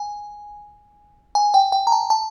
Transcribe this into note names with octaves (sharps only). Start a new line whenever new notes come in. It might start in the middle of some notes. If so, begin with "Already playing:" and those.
Already playing: G#5
G#5
G5
G5
A#5
A5
A5